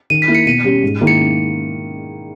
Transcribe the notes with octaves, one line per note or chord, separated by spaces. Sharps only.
D#3 D#7
B6
A#3 E4
C#7
B2 D#7
G3 C#4 G4
G#2
D#3 A#3 E4
C#7